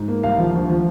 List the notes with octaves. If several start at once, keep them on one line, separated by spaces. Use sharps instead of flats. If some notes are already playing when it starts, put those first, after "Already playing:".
Already playing: G#2
A#3
C2 F5
F3
D2
F3